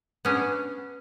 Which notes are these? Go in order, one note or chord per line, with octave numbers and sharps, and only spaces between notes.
B3 C#4 D4